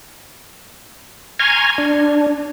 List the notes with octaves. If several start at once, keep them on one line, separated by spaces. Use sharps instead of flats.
G#5 A#5 C6 C#6 F6 G#6
D4